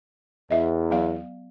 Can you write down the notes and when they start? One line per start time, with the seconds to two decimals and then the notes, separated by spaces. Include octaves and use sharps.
0.51 E2 D#5 E5
0.91 F#3 B3 F5